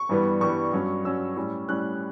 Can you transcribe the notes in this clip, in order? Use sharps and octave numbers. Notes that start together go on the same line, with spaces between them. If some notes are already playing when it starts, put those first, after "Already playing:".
Already playing: C#6
G2 E3 G3 B3
G2 E3 G3 B3 C#6
G2 F#3 C#4
G2 F#3 C#4 E6
A2 G3 C#4
A2 G3 C#4 F#6